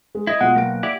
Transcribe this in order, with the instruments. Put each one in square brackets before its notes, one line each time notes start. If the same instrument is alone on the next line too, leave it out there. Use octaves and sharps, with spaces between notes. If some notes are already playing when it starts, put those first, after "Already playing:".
[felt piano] G#3
[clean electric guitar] E4 [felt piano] D#5 D#6 A#6
[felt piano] B2 F4 [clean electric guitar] G#3 [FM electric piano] F#5
[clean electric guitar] B1 [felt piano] A#3 G5 D7
[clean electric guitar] E4 G4 D5